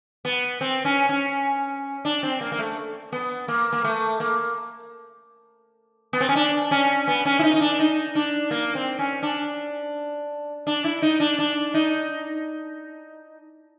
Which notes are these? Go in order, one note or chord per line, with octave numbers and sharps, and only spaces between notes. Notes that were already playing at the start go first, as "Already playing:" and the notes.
B3
C4
C#4
C#4
D4
C4
A#3
A#3
A3
B3
A#3
A#3
A3
A#3
B3
C4
C#4
D4
C#4
B3
C#4
E4
D#4
D#4
D4
D#4
D4
A#3
C4
C#4
D4
D4
E4
D#4
D4
D4
D#4